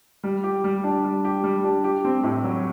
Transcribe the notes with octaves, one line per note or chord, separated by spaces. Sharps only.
G3
G4
G3
D4
G3
G4
G3
D4
G4
C4
A2
F#3